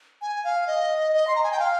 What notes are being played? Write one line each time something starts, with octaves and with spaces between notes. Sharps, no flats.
G#5
F5
D#5
D#5
C6
A#5
G#5
G5
F5